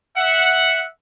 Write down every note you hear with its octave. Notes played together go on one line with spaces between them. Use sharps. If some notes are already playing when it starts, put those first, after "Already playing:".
E5 F#5